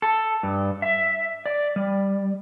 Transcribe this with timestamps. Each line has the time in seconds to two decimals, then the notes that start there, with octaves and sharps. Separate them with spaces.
0.02 A4
0.43 G2
0.82 E5
1.46 D5
1.76 G3